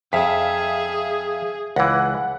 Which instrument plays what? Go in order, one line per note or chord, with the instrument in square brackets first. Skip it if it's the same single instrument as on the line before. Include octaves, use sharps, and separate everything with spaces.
[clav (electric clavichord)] F2 [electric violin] G#4 [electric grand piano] E5 F5 B6
[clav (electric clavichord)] C#2 E3 [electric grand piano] F#5